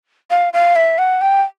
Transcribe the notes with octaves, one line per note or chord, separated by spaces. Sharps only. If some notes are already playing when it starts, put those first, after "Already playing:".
F5
F5
E5
F#5
G5